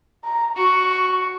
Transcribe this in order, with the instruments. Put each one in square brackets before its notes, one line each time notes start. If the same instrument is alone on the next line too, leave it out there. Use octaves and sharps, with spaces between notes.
[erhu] A#5
[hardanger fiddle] F#4 [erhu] C#6